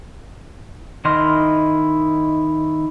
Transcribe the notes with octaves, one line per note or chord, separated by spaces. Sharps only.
D#3 E4 D#5 C6 F6